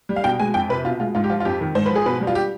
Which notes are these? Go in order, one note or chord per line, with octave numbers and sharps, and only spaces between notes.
G3
F5
B2 G5
G#3 G#5
F2 G5
C3 B4
B2 F4
G#3 F4
G#2 F4
G4
F3 F4
F4
F2 G4
D#3
G#2 C5
F3 B4
G#4
B2 B4
G3
F4
G4